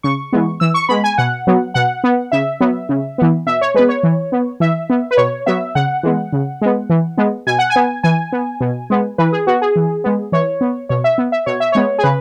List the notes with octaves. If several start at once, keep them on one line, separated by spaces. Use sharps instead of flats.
C#3 C#6
E3 G#3 B3
E3 E6
C#6
G#3 B3 B5
G#5
B2 F#5
F#3 B3
B2 F#5
B3
C#3 E5
F#3 B3
C#3
E3 B3
B2 E5
C#5
G#3 B3 B4
C#5
E3
B3
E3 E5
B3
B4
B2 C#5
F#3 B3 E5
C#3 F#5
E3 G#3 B3
C#3
G#3 B3
E3
G#3 B3
B2 G#5
F#5
G#5
B3
E3 G#5
B3
B2
G#3 B3
E3 B4
G#4
B3 F#4
G#4
E3
G#3 B3
E3 C#5
B3
B2 C#5
E5
B3
E5
B2 C#5
E5
G#3 B3 C#5
G#4
C#3 B4